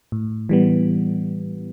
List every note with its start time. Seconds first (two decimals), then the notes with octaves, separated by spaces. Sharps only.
0.12 A2
0.49 E3 G3 B3